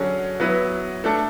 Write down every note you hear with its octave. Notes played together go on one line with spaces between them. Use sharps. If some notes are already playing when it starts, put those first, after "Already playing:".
Already playing: D3 F#3 C#4 G#4
F#3 B3 E4 B4
A3 D4 A4